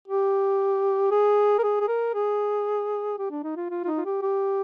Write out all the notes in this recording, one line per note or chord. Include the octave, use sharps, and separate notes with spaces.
G4
G#4
A#4
G#4
G#4
A#4
G#4
G4
D4
D#4
F4
F4
F4
D#4
F4
G4
G4